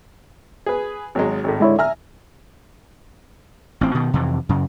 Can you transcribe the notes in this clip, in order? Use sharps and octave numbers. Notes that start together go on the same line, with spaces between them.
G#4 B4
G#1 F#3 G#3
G#1 A2
D3 G#3 E4 C#5
E5 G#5 A#5 F6
A1 C4
B2 D#3
F2 C3 E3
F#2 C#3